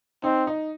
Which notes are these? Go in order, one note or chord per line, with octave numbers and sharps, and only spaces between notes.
C4 D#4
D#4